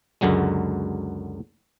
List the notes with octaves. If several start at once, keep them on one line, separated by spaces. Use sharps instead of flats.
C#2 F#2 D3 F#3 G#3